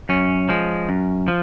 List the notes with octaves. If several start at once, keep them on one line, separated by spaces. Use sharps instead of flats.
F#2 C#4
F3 G#3
F#2
F3